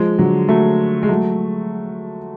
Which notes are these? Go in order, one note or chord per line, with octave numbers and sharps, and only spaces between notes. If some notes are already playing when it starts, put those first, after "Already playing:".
Already playing: F3 G#3
D3 F#3
F#3 A3
G#3
F#3 A3